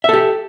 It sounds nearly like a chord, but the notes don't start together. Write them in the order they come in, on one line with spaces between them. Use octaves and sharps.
E5 A4 G4